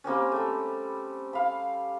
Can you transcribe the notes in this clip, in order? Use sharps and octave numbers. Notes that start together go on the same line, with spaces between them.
G3 A#3 C4 C#4
G3 A3
F5 B5